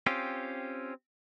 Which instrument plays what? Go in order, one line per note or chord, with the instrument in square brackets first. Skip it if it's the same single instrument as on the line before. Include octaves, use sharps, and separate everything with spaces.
[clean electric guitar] C4 C#4 F4 G4